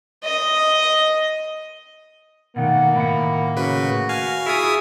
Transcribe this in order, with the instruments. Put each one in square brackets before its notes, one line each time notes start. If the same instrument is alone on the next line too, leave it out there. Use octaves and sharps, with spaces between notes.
[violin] D#5
[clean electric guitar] B2 D#3 A3 [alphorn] A#3 [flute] F#5
[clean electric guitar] A2 D#3 F#5 [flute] B5
[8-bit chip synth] C#3 B4 [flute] F#4
[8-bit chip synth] F5 G#5
[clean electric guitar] E4 F4 [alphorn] G#4 [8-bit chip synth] E5 G#5 D#6